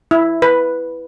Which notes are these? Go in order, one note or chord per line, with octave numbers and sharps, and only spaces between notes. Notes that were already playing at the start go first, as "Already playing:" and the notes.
E4
B4